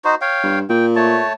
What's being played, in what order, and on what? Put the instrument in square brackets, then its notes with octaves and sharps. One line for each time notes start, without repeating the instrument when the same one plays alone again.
[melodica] D#4 F#4 C5
C#5 F5 G5
[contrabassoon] G2
[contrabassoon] A#2 [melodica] G5
[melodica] A3 C#5 A5